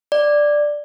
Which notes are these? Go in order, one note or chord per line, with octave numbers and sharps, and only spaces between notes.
D5